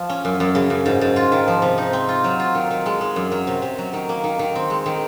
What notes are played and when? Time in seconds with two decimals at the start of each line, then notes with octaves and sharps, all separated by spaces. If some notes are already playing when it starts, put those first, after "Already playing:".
Already playing: F3
0.09 C#4
0.25 F#2
0.40 F#2
0.55 C#3
0.70 F#2
0.86 G#2
1.01 G#2
1.16 F4
1.32 D#3
1.48 F3
1.62 C3
1.78 D#4
1.93 C4
2.09 F4
2.24 F#3
2.40 F4
2.55 D#3
2.71 D#3
2.86 G#3
3.01 G#3
3.16 F#2
3.32 F#3
3.47 C3
3.62 C3
3.78 F#3
3.93 D#3
4.09 A#3
4.24 D#3
4.39 D#3
4.55 C4
4.70 G#3
4.86 D#3